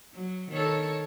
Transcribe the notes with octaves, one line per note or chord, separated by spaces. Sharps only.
F#3
D#3 A4 C#5